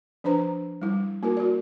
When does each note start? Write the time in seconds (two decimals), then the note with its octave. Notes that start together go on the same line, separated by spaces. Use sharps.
0.24 F3 D4 B4 C5 A#5
0.82 G3 E4
1.23 A#3 E4 F#4 A#4
1.37 F#4 D5